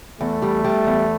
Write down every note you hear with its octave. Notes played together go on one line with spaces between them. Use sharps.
E2 A3
G3
G3
E2